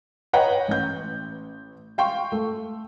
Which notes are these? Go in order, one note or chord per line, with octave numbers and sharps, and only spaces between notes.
B4 C#5 D#5 F#5 G5 A#5
A1 G6
F5 G5 C6 C#6
A3